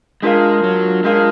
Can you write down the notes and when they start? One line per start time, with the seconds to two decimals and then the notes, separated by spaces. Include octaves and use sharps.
0.23 G#3 D4 F4 A#4 F5
0.63 F#3
1.04 G#3 D4 F4 A#4 F5